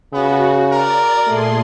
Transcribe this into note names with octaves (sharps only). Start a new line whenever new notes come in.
C#3 B3 F#4
A#4 D5
A#2 A3 G#4 C6